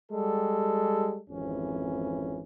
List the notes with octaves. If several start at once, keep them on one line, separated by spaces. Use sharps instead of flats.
G3 G#3 G4 A4
G#1 F2 E3 C#4